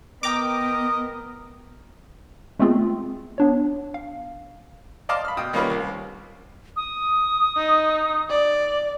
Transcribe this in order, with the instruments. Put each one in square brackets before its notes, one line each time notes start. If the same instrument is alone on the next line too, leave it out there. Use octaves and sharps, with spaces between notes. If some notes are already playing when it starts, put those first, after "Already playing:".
[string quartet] B3 [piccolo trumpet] A#4 [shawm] D#5 [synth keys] G5 A#5 D6
[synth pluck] G#3 A3 B3 C4 F4 G#4
B3 D4 C#5
F5
[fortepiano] D5 D#5 F5 A5 C6 D6
B5 F6
B2 G5 D#6
D#3 G3 A#3 C#4 F4 B4
C2
[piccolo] D#6
[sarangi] D#4
D5